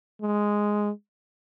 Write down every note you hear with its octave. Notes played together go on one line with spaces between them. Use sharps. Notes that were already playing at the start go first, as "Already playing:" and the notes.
G#3